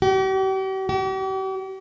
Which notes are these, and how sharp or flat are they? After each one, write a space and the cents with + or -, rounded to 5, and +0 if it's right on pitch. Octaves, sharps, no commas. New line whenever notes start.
G4 -45
G4 -45